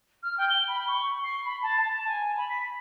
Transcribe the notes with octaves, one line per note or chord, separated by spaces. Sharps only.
F6
G5
G7
B5
C#6
C7
B5
A5
A5
G#5
B5
B6